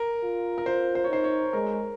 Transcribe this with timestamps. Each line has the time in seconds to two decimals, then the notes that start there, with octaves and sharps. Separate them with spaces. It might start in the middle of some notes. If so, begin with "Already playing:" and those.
Already playing: A#4
0.23 F4
0.58 A#4
0.66 F4 C5
0.95 C5
1.04 C#5
1.09 D#4 C5
1.24 C#5
1.53 G#3 A#4